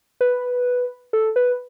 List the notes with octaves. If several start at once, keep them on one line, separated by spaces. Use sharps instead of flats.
B4
A4
B4